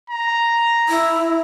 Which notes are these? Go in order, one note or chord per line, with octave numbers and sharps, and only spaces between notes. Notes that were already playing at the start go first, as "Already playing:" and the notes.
A#5
E4